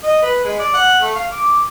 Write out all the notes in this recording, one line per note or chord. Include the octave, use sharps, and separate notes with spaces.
D#5
B4
G#3
D5
F#5
A3
F5
D6